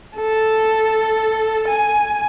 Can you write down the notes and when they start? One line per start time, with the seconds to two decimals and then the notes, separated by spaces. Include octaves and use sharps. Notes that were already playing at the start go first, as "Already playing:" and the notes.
0.17 A4
1.68 G#5